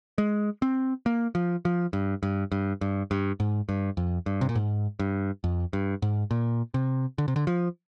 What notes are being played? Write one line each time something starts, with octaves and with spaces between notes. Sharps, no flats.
G#3
C4
A#3
F3
F3
G2
G2
G2
G2
G2
G#2
G2
F2
G2
C3
A#2
G#2
G2
F2
G2
G#2
A#2
C3
D3
C3
D3
F3